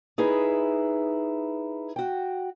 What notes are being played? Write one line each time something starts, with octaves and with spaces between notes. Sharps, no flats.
D#4 E4 G#4 B4
F#4 G5